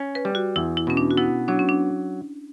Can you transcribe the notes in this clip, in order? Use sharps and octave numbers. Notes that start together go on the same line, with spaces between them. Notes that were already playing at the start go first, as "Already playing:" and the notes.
Already playing: C#4
B4
G3
F#4
E2 E4
E4
B2 C#4
D4
F#4
B3 E4
F#3 D4
C#4
D4